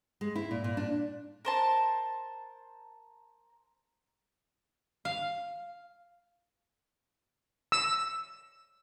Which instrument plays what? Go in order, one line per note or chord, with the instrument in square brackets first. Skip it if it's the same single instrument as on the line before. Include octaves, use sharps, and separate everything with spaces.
[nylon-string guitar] G#3
E4
A#2
A#2
D4
[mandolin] A#4 C5 A5
[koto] F5
[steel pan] E6